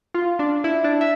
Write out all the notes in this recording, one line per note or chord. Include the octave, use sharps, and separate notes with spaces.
F4
D4
E4
D4
E5